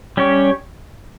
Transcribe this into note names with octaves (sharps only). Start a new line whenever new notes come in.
G3 C#4 G4 C#5